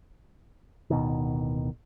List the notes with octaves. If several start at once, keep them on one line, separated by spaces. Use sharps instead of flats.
D1 B2 D#3